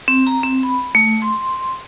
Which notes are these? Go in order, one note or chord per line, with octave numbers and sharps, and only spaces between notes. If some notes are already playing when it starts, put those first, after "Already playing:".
C4
A#5
C4
B5
A3
C6